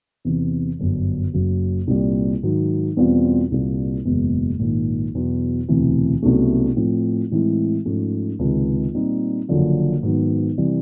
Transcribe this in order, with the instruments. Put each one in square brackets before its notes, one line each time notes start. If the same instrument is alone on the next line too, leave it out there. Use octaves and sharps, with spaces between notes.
[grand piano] E2 C3 E3
G1 F#2 D3
F#1 F#2 C#3 F#3
C2 A#2 G3
G#2 D#3 F#3
E2 B2 G3 C4 F4
C2 A#2 G3 A#3
F#1 E2 B2 G#3
A#1 G#2 D#3
E1 E2 B2 F#3
E1 D2 C3 E3
C2 B2 F#3 A3 C#4
A2 F3 A3 C4
A2 E3 G#3 C4 E4
G#2 F3 A3 C#4
C#2 C3 D#3 G#3
A#2 G3 C4 D#4
F#1 F#2 D3 F3
G#2 D#3 F#3 B3
C3 E3 G3